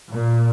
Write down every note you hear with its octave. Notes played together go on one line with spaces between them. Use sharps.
A#2